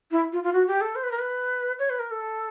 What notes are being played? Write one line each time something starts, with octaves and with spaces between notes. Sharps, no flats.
E4
F4
F4
F#4
G4
A4
C5
B4
A#4
B4
C#5
B4
A#4
A4